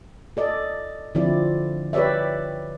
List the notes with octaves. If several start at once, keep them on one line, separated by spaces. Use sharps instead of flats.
A4 D5 D#5
D3 F3 C4 E4 D5
G4 B4 C#5 D5 E5